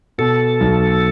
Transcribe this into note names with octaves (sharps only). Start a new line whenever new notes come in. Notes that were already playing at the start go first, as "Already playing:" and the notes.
B2 A4
B1